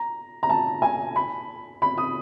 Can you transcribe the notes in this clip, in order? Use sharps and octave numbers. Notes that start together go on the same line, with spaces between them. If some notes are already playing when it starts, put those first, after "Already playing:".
Already playing: A#5
A#5
A5
G#5
B5
B5
D#6